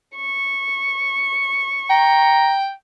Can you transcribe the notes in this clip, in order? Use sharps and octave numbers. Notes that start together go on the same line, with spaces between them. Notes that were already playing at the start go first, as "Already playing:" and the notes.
C#6
G5 A#5